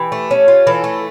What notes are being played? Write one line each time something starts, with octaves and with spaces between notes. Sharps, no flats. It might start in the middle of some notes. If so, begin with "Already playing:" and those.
Already playing: E3 G4
A3
C#4
F4
E3 A4
A3